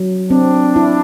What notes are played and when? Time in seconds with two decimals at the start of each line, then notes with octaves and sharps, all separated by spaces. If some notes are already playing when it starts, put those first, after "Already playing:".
Already playing: F#3
0.30 C4 D4
0.76 E4